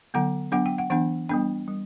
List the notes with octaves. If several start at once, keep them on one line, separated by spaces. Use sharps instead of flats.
D3 F#3 B3 F#5
F#3 B3 D4 F#5
G5
F#5
E3 B3 D4 F#5
G3 B3 D4 G5
G3